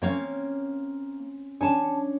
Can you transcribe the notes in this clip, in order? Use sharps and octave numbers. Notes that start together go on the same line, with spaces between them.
A#3 C4 C#4 C#5 F5
C#4 D4 C#5 G#5 A5